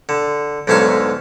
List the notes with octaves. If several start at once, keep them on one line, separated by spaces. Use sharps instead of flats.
D3
B1 G#2 D3 A3 C#5 F5